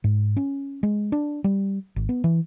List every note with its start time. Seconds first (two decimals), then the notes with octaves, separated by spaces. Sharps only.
0.04 G#2
0.37 C#4
0.83 G#3
1.12 D4
1.44 G3
1.96 G#1
2.09 B3
2.24 E3